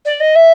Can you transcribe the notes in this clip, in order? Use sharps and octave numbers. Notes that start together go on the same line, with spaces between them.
D5
D#5
E5